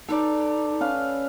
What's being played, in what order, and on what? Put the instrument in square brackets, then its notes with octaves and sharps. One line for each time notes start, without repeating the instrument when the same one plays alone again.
[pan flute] D#4 [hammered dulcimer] A4 B4 D5
[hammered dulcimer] C#4 B4 F5